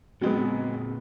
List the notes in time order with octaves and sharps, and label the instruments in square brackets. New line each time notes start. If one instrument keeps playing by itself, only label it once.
[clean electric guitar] A#2 C4 G5 [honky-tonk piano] F#3 G#3 B3